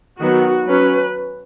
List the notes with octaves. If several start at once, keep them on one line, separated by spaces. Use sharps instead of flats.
D#3 F#3 B3 F#4
F#3 C#4 B4